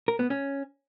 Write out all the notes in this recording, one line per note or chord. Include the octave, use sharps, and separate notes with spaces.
A#4
B3
C#4